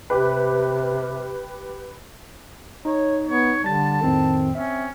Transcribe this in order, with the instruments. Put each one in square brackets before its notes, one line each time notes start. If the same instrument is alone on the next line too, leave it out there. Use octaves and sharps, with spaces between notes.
[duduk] C3 [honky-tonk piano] G4 B4
[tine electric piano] D#4 [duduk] C#5
[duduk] B3 [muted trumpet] C#5
[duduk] D3 [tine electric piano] G3 A6 [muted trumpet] A5
[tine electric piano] F2 A2 D#3 [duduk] C4
[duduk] C4 [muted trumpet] C#4 [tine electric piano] E5